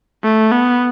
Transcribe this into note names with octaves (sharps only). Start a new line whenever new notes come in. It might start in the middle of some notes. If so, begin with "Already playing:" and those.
A3
B3